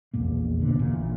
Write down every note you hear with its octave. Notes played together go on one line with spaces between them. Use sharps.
A#1 E2 A#2 A#3
B2 D3
A1 A#2